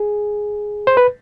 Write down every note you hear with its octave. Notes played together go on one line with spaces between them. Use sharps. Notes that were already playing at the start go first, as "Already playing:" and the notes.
Already playing: G#4
C5
B4